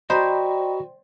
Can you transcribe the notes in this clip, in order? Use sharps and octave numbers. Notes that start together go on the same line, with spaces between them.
F#4 C5 D5 D#5 G5 A#5 B5